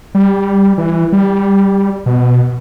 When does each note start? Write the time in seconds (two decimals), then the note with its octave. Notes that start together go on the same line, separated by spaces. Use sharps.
0.15 G3
0.78 E3
1.12 G3
2.06 B2